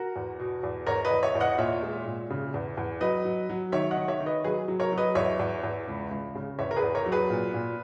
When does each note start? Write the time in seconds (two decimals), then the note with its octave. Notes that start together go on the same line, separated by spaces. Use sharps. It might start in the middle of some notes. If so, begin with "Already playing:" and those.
Already playing: F#4 A#4
0.16 E2
0.39 B2
0.63 E2
0.87 E2 A#4 C#5
1.05 B4 D#5
1.11 E2
1.23 C#5 E5
1.35 E2
1.40 D#5 F#5
1.58 A#2 C#5 E5
1.83 G#3
2.06 A#2
2.30 C#3
2.54 E2
2.77 E2
3.01 F#3 B4 D#5
3.25 F#3
3.50 F#3
3.72 D#3 C#5 E5
3.91 D#5 F#5
3.97 D#3
4.08 C#5 E5
4.20 D#3
4.26 B4 D#5
4.44 F#3 G#4 B4
4.68 F#3
4.80 A#4 C#5
4.92 F#3
4.98 B4 D#5
5.15 E2 C#5 E5
5.39 E2
5.63 E2
5.87 C#2
6.11 C#2
6.35 C#3
6.59 E2 C#5 E5
6.71 A#4
6.76 G#4 B4
6.82 E2
6.95 A#4 C#5
7.06 F#3
7.12 G#4 B4
7.30 A#2
7.54 A#2